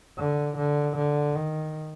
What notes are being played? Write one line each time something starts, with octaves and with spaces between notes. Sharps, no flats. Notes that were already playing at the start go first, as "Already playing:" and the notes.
D3
D3
D3
D#3